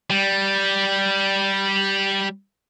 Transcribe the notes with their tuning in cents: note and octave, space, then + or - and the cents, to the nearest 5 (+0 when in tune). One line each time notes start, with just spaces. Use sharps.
G3 -5